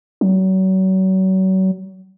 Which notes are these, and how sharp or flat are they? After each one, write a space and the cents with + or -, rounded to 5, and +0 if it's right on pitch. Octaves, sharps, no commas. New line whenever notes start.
F#3 +35